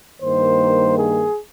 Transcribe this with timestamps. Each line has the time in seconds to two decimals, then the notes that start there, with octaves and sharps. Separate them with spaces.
0.20 G2 D#3 A#3 C5
0.96 G#4